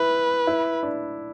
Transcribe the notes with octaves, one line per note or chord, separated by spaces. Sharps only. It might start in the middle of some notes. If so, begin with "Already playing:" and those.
Already playing: E4 B4
E4
D4